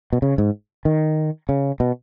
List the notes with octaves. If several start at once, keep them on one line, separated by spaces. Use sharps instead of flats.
B2
C#3
G#2
D#3
C#3
B2